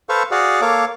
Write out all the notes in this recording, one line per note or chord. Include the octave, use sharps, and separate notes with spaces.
A4 B4 C5 F5 C#6
F#4 G#4 D5 F5 F#5
A#3 A4 C#5 F5 D6